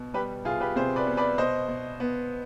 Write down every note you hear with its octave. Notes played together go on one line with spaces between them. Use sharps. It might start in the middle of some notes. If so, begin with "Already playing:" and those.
Already playing: B2
G3 G4 B4
C2 F4 G#4
G4 B4
C3 G#4 C5
B4 D5
B3
B4 D5
B2 C5 D#5
B2
B3